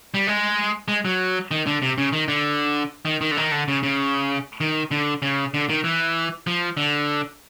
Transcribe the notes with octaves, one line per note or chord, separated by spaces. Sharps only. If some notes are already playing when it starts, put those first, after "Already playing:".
G3
G#3
G#3
F#3
D#3
D3
C3
C#3
D#3
D3
D#3
D#3
D3
D#3
D3
C#3
C#3
D#3
D3
C#3
D3
D#3
E3
F3
D3